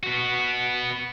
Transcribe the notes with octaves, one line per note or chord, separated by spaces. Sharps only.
B3 F#4